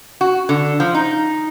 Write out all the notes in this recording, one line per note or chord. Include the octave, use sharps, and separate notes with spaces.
F#4
D3
F3
D#4